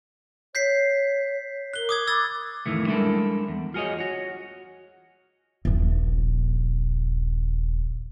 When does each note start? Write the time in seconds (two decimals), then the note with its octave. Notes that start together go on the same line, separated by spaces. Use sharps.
0.55 C#5 G6 B6 C7
1.74 A#4 F#6 G7
1.89 D6 D#6 G#6
2.07 B5 D6 E6 F#6 G#6 A6
2.66 F2 A2 D#3 E3 A3
2.86 G3 G#3 D4 E4 A4 A#4
3.48 E2
3.74 F4 F#4 G#4 B4 C#5 D#5
3.99 F#4 C#5
5.65 D#1 A#1